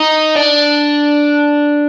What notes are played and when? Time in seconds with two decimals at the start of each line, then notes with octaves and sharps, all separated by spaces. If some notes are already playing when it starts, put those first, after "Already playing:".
Already playing: D#4
0.36 D4